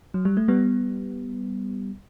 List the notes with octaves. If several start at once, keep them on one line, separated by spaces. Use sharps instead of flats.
F#3
G3
A3
G3 B3